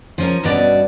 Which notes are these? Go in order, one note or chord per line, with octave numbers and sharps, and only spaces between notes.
F3 C#4 A#4
G2 B2 C#4 F#4 D5